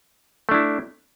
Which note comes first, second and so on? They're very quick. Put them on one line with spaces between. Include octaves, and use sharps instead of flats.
A3 D4 E4